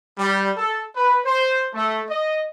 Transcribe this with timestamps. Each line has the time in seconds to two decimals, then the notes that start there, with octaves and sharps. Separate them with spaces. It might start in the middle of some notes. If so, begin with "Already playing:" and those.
0.18 G3
0.57 A4
0.96 B4
1.26 C5
1.74 A3
2.09 D#5